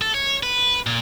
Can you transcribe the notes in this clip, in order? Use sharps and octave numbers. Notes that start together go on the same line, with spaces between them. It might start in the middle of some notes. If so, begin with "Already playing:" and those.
A4
C#5
B4
A#2